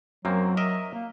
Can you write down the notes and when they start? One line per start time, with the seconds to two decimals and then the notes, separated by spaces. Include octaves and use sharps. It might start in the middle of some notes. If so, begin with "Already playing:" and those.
0.25 F#2 F#3 A#3 C4
0.57 A#4 D#5 E5
0.93 A#3